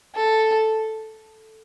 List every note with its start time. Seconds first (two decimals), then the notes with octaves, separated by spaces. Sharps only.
0.15 A4